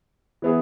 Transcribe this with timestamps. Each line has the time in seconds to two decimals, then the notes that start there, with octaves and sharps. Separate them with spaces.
0.42 E3 B3 E4 G#4